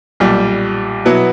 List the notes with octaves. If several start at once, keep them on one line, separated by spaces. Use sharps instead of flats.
B1 A#2 G3
B2 F#3 B3 E4